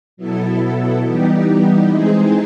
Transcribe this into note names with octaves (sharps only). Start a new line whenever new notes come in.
B2 F#3 B3 E4 A4
E3 G3 B3 D#4 G4
E3 G#3 C4 D#4 G#4